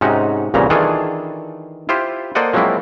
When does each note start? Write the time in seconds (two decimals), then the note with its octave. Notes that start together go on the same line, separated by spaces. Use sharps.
0.01 G#2 C3 C#4 D#4 F#4
0.54 C2 A#2 C#3 E3 A#5
0.70 D#3 E3 D4 F4 G#4 A4
1.89 E4 F4 G4 C5
2.35 A#3 A4 C5 D5 D#5 F#5
2.53 F3 F#3 G#3 A#3 C4 E4